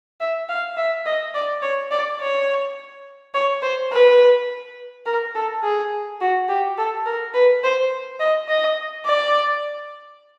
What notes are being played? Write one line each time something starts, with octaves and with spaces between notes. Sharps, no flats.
E5
F5
E5
D#5
D5
C#5
D5
C#5
C#5
C5
B4
A#4
A4
G#4
F#4
G4
A4
A#4
B4
C5
D#5
D#5
D5